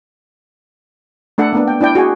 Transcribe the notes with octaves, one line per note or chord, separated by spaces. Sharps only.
A3 D4 A4 F#5
A#3 B3 D4
G5
D4 E4 D5 G5
F#4 G#4 G#5